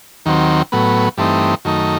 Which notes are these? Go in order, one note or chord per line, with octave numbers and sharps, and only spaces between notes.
D#2 D#3 F#3 C4
A2 F#3 B3
G2 E3 A3 C4 D#4
F#2 D#3 A3 D#4